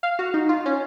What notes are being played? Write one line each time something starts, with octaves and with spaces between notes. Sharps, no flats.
F5
F#4
D#4
F4
C#4